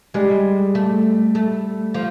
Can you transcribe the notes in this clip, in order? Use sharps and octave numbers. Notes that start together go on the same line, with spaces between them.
G3 G#3
A3
A3
F3